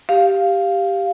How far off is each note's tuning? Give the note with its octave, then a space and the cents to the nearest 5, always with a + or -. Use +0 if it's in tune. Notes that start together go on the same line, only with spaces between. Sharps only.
G4 +0 F5 +0